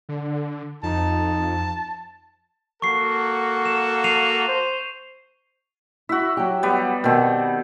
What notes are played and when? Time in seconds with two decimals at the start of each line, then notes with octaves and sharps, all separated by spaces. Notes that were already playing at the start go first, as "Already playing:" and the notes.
0.09 D3
0.83 F2 D#4 A5
2.82 A#3 F#4 A4 C#6 C7
3.66 E7
4.04 C7 D#7 F7
4.48 C5
6.09 E4 F#4 E5
6.37 F#3 G4
6.63 G3 B3
7.04 B2 D#3 C4